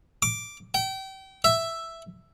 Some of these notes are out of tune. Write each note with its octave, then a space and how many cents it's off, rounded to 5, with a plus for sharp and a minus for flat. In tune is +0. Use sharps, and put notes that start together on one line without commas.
D6 +0
G5 -30
E5 +5